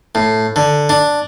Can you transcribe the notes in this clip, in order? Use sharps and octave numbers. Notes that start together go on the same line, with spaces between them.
A2
D3
D4